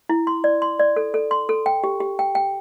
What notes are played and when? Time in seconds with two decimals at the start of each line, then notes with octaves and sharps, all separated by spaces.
0.09 E4
0.27 C6
0.44 D5
0.62 C6
0.79 D5
0.96 A4
1.14 A4
1.31 C6
1.49 A4
1.66 G5
1.84 G4
2.00 G4
2.19 G5
2.35 G5